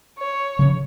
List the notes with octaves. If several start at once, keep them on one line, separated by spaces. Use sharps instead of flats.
C#5
C#3 F3